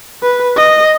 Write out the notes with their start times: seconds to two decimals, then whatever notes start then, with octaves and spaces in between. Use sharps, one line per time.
0.23 B4
0.56 D#5